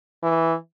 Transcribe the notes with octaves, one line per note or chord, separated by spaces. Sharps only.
E3